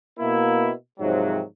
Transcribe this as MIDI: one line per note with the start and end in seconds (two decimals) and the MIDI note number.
0.19 0.71 47
0.19 0.71 58
0.19 0.71 64
1.00 1.42 44
1.00 1.42 48
1.00 1.42 51
1.00 1.42 53
1.00 1.42 54